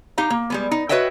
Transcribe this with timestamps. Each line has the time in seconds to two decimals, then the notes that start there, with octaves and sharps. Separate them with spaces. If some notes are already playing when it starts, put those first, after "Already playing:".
0.18 D#4 G4 F5 A#5
0.30 A#3
0.50 G3 G#3 B3
0.71 D#4
0.89 F#4 B4 C#5 D#5 E5 G5